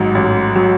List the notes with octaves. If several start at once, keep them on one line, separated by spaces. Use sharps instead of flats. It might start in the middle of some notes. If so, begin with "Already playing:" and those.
Already playing: A1 G#2 F#3
A1
F#3